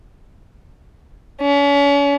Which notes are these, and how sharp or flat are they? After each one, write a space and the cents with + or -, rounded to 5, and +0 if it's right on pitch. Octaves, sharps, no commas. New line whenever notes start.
C#4 +40